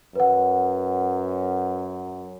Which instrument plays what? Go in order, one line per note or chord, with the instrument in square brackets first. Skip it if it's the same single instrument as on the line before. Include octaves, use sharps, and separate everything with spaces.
[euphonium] F#2 [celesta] B4 F#5